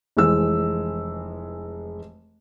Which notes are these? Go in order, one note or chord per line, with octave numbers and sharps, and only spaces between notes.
F1 E3 G#3 E6